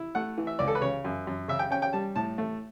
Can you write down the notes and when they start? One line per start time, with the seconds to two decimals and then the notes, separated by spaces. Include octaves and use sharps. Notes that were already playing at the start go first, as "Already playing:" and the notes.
Already playing: E4
0.15 A3 F#5
0.38 E3
0.47 E5
0.59 C#2 D5
0.68 A4
0.75 B4
0.81 C#3 C#5
1.04 F#2
1.27 F#2
1.48 C#3 E5
1.59 G5
1.70 C#4 G5
1.82 G5
1.93 G3 A5
2.16 A2 A5
2.38 A3